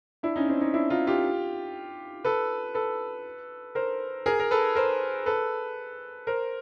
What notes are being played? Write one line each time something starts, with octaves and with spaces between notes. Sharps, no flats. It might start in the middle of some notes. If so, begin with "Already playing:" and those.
D4 E4
C#4 D#4
C4 D4
C#4 D#4
D4 E4
D#4 F4
F4 G4
A4 B4
A4 B4
A#4 C5
G#4 A#4
A#4
A4 B4
A#4 C5
A4 B4
A#4 C5